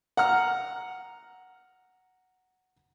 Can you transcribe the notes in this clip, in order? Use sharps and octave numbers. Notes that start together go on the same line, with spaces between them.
F#5 A#5 F6